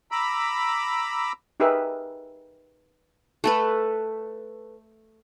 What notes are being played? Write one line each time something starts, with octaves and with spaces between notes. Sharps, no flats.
A#5 B5 D6 E6
D#4 G4 G#4 A#4 B4 E5
A3 A4 B4